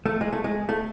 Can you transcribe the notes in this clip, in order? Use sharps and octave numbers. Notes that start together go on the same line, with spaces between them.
A3
G#3
A3
G#3
A3